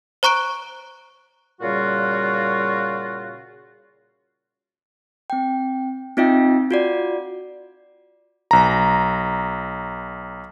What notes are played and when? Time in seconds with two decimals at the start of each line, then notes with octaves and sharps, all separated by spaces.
0.23 C5 A#5 C#6 F#6 D7
1.61 A#2 C#3 G3 F4 F#4
5.30 C4 G5
6.17 C4 D#4 F4 D#5 E5 G5
6.71 F4 F#4 D5
8.51 B1 A#5